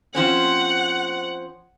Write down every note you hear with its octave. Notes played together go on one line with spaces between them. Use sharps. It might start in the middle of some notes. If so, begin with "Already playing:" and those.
F3 C4 C#4 F#5